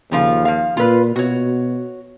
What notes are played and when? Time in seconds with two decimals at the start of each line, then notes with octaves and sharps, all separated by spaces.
0.11 D#2 C#3 F3 F4
0.45 F3 F5
0.77 A#2 F4 B4
1.16 B2 F#4 C#5